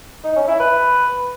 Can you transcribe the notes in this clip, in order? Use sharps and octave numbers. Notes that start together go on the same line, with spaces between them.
D#4
C#4
E4
B4